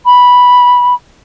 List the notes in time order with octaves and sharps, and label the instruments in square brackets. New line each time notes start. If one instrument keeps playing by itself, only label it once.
[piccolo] B5